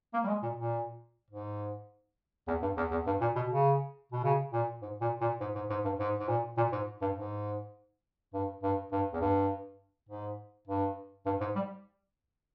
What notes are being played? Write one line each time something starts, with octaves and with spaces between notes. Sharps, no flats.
A#3
G3
G#3
A#2
A#2
G#2
E2
G2
E2
E2
G2
A#2
B2
C#3
B2
C#3
A#2
G#2
A#2
A#2
G#2
G#2
G#2
G2
G#2
G#2
A#2
A#2
G#2
G2
G#2
G2
G2
G2
E2
G2
G#2
G2
G2
G#2
G3